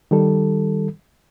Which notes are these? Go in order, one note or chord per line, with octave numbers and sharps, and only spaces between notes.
D#3 G3 A4